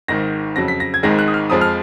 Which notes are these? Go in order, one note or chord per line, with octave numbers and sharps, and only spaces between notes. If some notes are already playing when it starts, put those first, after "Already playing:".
G#1 G#2 D#3 A#6
F2 C#3 F#3 A#6
B6
A#6
G#6
G#1 G#2 D#3 G#3 A#6
F#6
D#6
F6
F2 F3 G#3 D#6
F6